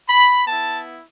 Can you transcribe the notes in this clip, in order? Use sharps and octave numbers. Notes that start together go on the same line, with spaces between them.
B5
B3 E4 A5